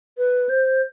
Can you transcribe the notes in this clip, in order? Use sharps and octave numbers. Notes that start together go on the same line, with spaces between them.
B4
C5